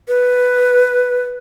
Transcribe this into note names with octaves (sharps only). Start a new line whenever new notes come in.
B4